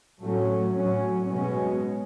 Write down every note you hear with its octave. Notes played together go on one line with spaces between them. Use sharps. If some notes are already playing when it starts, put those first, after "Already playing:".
A2 F#3 A3 C#4
A2 F#3 C#4
B2 G#3 C#4